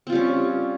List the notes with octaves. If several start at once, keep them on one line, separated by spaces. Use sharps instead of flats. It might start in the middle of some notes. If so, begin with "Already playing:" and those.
G3 C4 C#4 F4